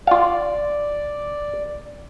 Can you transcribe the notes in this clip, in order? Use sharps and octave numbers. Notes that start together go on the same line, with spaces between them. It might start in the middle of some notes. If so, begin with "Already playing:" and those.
F4 D5 F5